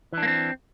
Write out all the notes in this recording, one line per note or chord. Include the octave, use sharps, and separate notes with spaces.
E3 A#3 C4 D4